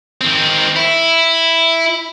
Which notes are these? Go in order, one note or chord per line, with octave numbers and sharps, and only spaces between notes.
D#3 C4
E4